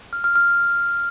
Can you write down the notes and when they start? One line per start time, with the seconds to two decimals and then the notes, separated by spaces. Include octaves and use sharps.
0.13 F6
0.24 F6
0.36 F6